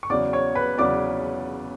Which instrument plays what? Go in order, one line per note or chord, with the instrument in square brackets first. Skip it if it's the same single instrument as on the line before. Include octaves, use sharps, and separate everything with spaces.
[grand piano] C#6
E2 C#3 F#3 D5 D6
C#5 C#6
B4 B5
E2 C#3 F#3 D5 D6